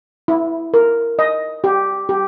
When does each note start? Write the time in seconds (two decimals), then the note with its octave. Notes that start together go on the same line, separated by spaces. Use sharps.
0.28 E4
0.74 A#4
1.19 D#5
1.64 G4
2.09 G4